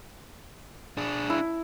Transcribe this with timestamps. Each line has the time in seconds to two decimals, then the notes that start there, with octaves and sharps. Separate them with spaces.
0.97 D4 G#4
1.30 E4